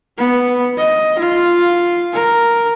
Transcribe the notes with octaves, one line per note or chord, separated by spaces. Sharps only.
B3
D#5
F4
A#4